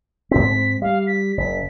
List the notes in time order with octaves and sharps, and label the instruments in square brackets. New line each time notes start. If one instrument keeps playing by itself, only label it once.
[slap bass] G#2 C4 [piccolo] B6
[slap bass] G3 [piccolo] F5
[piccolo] B6
[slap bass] F#1 [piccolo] B6